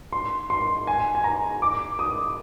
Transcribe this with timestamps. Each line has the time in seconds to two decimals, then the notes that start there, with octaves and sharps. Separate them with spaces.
0.12 C6
0.50 C6
0.87 G#5
1.15 G#5
1.24 A#5
1.62 D6
1.99 D#6